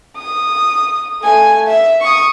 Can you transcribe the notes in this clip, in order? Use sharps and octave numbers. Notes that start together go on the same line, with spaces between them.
D#6
A3 G#5
E5
C#6 D#6